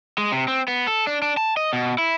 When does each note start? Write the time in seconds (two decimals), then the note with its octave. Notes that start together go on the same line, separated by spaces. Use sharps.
0.18 G#3
0.32 C3
0.48 C4
0.68 B3
0.88 A4
1.07 D4
1.22 D4
1.37 A5
1.57 D#5
1.73 B2
1.98 E4